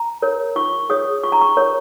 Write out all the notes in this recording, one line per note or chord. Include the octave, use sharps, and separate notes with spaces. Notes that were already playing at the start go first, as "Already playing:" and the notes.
Already playing: A#5
A#4 C#5
F4 C#6
G#4 C#5 D#6
F4 C#6
A#5
C#6
A#4 C#5